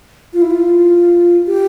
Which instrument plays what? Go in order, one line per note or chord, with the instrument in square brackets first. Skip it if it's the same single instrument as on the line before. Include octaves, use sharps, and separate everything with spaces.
[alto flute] F4
E4
F4
G4